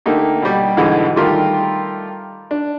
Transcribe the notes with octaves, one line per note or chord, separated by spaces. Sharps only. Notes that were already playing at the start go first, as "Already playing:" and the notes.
D3 A3 A#3 D#4 G4
B2 G3
G#2 B2 D3 E3 G#3
D#3 G3 A3 F4 G4 A#4
D4